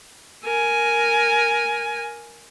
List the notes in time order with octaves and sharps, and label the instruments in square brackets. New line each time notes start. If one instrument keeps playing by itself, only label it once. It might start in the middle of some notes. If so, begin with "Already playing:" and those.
[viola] A#4 G#5